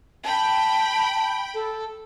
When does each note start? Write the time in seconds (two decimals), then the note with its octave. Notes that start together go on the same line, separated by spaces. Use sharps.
0.25 G5 A5 B5
1.54 A4